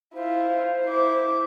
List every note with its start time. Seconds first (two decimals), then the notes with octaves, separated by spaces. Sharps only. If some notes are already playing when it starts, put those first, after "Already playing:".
0.15 E4 F4 C5
0.86 E4 D6